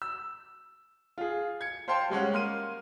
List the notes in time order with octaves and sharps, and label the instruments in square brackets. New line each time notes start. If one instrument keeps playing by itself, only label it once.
[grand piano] E6
F4 G#4
G#6 C#7
C5 F5 G5 A5 C6
G3 G#3 C#4 F#5
A#3 C6 F6 D#7